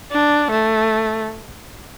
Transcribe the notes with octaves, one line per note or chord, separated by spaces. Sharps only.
D4
A3